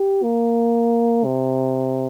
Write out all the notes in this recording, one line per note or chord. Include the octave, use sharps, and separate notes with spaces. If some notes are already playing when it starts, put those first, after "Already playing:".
Already playing: G4
A#3
C3